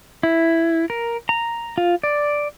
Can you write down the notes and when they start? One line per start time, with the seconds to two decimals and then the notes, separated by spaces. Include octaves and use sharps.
0.23 E4
0.90 A#4
1.29 A#5
1.78 F4
2.03 D5